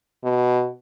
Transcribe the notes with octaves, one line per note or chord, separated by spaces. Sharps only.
B2